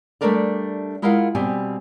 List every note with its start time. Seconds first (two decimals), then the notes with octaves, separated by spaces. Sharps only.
0.21 G3 A3 D4 A4 A#4 D5
1.02 G#3 E4 F4 A#4 F5 F#5
1.35 B2 G3 C4 G4 G#5